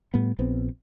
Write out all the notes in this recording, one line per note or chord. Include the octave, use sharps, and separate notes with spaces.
A2 G3 B3
A#1 B3 C4